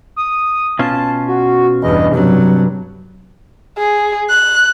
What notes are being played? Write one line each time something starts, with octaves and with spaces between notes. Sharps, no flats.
D#6
B2 C#4 F4 A5
F#4
E2 G2 D#5
G2 C3 F#3
G#4
F#6